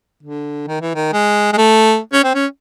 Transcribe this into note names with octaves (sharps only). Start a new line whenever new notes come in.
D3
D#3
E3
D#3
G#3
G#3
A3
C#4
C4
C#4